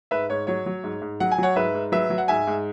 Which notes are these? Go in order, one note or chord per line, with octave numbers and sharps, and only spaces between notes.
G#2 B4 E5
G#2 C#5
F#3 C#5
F#3
G#2
G#2
F#3 F#5
G#5
F#3 C#5 F#5
G#2 B4 E5
G#2
F#3 B4 E5
F#3
F#5
G#2 E5 G#5
G#2